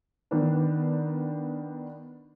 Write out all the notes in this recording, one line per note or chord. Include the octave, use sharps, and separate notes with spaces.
D#3 B3 D4